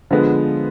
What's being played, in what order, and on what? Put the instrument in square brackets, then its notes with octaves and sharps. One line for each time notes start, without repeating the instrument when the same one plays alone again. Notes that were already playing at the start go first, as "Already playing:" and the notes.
[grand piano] D3 F3 G#3 B3